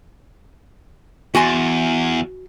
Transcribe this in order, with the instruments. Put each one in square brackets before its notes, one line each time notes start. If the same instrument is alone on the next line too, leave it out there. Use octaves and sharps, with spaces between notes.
[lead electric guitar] E2 [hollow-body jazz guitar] F#4 G#5 C6